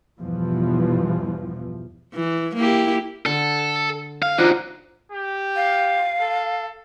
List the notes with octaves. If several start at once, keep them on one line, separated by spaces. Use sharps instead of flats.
E2 G2 B2 E3 F3
E3
A#3 E4 G4
D3 A4
F5
F3 D4 D#4 F#4
G4
F5
A4